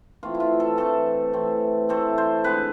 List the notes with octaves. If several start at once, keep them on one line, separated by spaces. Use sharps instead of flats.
E3 A3 C4 F4
E4
F4
A4
E3 A3 C4 A4
E3 A3 C4
E3 A3 C4 A4
C5
D3 G#3 C4 B4